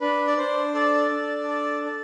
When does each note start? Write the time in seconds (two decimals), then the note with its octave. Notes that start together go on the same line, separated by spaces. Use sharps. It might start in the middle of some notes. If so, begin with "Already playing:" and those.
0.01 D4 B4
0.27 D5
0.38 D4 C5
0.74 A4 D5
1.11 D4
1.48 A4
1.84 A4